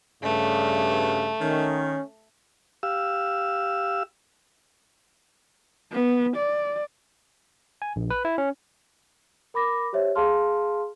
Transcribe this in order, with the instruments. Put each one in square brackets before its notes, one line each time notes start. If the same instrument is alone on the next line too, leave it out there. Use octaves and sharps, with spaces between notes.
[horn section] G2 [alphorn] C#3 [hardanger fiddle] A3
[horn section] D#3 [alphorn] C#4
[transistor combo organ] G4 F5 E6
[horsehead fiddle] B3
D5
[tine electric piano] G#5
A#1
B4
E4
C#4
[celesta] A#4 B5 D6 A#6
G4 C5 C#5 E5
G#4 F5 A5 C6 F6